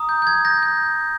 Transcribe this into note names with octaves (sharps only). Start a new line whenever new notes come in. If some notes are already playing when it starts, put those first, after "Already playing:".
Already playing: A#5 D#6
G6
G6
G#6
G6 A#6
G6